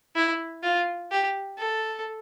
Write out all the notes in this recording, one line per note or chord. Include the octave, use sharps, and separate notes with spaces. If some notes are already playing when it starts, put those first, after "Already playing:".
E4
F4
G4
A4